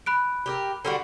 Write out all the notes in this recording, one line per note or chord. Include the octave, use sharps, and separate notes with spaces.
B5 F#6 D7
G4 G#4 A#4
D3 G3 F#4